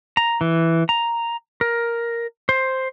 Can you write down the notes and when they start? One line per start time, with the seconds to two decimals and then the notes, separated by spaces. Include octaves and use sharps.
0.17 A#5
0.41 E3
0.89 A#5
1.61 A#4
2.49 C5